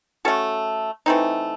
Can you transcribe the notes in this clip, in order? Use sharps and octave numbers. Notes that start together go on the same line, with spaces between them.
A3 C#4 F#4 A4
E3 A3 C4 D#4